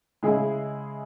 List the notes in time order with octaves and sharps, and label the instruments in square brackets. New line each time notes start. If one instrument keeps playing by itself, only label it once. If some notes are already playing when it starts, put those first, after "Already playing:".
[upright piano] C#3 G#3 E4 G#4